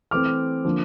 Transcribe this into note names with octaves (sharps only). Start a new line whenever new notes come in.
E3 A3 C4 D6 F6
D3 F3 A#3